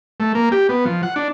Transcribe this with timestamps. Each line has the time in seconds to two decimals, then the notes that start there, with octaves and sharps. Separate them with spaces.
0.20 A3
0.35 A#3
0.52 G4
0.69 B3
0.85 F3
1.03 F#5
1.16 D4